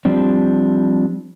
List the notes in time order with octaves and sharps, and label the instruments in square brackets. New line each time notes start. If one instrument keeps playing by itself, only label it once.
[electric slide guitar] F3 G3 C4 D4